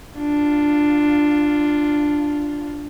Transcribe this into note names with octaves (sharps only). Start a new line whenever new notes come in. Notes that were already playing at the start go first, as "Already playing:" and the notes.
D4 F4